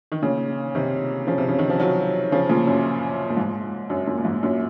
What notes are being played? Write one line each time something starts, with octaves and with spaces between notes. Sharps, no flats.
D#3
A#2 C#3
C3 D#3
C#3 F3
C3
C#3
D#3
F3
D#3 F#3
C#3 F3
A#2 C#3
F#2
A#2
G#2
F#2
F#2 A#2
A#2
G#2
F#2 A#2